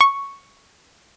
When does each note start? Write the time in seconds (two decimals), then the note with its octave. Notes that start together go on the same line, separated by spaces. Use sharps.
0.01 C#6